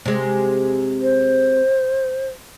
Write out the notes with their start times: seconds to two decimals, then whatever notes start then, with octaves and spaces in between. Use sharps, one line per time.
0.05 C3 G#3
1.02 C5